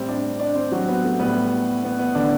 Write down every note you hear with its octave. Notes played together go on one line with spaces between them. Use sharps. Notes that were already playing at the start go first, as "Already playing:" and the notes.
Already playing: A2 G3 C4 C5
D4 D5
D4 D5
C4 C5
F#3 F#4
B3
A3
A2 G3 B3
B3
B3
D3 D4